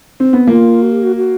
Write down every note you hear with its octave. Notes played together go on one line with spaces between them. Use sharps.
C4
B3
A#3 F4
F#4
G4
F#4
F#4